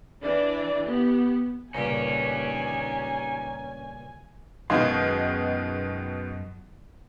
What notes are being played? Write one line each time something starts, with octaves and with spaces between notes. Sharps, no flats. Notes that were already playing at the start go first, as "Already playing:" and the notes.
E3 D4 D5
B3 G4
C#2 G2 A#2 C#4 D#4 G4 G#5
F#2 B2 D#3 G#3 F5 C6